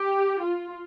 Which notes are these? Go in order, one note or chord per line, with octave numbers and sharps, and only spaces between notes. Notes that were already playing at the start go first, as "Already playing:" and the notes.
Already playing: G4
F4